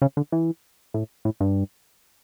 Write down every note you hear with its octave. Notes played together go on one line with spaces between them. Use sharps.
C#3
D3
E3
A2
A2
G2